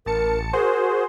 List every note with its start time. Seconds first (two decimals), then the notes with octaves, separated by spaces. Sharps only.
0.06 A1 A#4 A5 C#7
0.53 F#4 G#4 A#4 C5